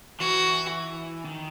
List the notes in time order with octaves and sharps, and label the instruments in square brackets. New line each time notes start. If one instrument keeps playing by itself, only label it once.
[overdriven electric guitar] E3 [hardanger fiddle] F#4
[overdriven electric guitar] D#3